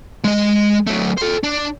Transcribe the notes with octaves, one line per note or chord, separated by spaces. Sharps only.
G#3 D#5
F#3 A3
A4 C5
D4